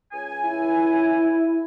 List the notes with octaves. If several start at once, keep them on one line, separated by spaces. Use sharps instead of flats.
C#2 G#5
E4